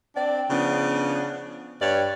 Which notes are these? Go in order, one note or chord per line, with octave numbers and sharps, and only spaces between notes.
C4 D4 D5
C#3 F3 B3 D4
G2 C#5 D5